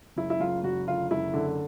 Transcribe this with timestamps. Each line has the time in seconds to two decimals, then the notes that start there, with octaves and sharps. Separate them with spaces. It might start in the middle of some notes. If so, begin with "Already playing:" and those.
0.16 F#1 E4
0.30 E4
0.40 F#1 F4
0.64 F#1 F#4
0.87 D3 F4
1.11 F#1 E4
1.34 D3